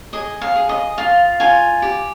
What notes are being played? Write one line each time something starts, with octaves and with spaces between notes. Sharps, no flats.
G#4 D#5
F5
G#4
D#5
F4 F5
F4 F5 G#5
G4